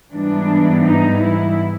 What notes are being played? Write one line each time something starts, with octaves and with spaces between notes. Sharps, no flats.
G#2 E3 G3 B3 D4
D#4
E4